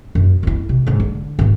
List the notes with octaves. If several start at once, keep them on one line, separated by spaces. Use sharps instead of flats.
F#2
F2 E4
C3
G#2 C#3
D3
G#1 A3